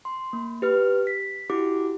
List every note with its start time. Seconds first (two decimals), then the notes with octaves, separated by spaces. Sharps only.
0.05 C6
0.33 A#3
0.62 G4 B4 F6
1.07 B6
1.50 E4 F#4 G4 D6